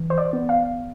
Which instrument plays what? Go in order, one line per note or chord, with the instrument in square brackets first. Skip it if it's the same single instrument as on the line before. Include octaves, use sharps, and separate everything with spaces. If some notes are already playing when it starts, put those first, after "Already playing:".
Already playing: [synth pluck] E3
C5
D5
B3
F5